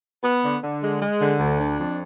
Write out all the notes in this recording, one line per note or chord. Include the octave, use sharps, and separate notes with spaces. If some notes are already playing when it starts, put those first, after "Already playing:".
B3
D3
D3
G#3
G#3
D3
D2
D4
F2